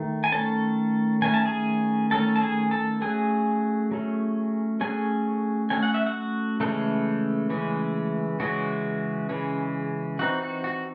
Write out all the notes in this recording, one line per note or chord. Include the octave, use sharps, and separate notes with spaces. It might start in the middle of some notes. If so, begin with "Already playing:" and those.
Already playing: D#3 A3
G#5
D#3 A3 C#4 A4 A5
D#3 A3 C#4 G#5
A5
G#4 G#5
D#3 A3 C#4 A4 A5
A5
G#4 G#5
A4 A5
F#3 A3 C#4 G#4 G#5
F#3 A3 C#4
F#3 A3 C#4 G#4 G#5
F#3 A3 C#4 G#5
F#5
E5
F#4 F#5
C#3 E3 G#3 A3 C#4 A4
C#3 E3 G#3 C#4
C#3 E3 G#3 C#4 F#4
C#3 E3 G#3 C#4
E3 C4 D#4 F#4
F#4
F#4